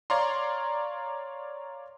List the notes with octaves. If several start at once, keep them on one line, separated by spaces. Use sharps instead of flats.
C#5 D5 F5 A#5 C6